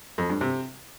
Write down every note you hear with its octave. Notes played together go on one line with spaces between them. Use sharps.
F2
G2
C3